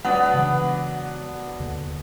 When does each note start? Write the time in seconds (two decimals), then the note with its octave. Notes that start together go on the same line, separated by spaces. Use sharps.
0.05 F#3 B3 D4 F#5
0.34 C#3 E3 G#3
1.60 D#2 D3